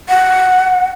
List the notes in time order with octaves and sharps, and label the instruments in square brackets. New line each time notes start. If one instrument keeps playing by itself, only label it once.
[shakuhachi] F#5